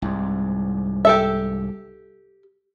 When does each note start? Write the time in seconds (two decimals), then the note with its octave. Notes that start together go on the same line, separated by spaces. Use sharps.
0.02 C2 G#2
1.05 G4 A4 E5